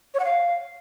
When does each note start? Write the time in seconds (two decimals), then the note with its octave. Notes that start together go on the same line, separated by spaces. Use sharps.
0.14 C#5
0.19 F#5
0.25 F5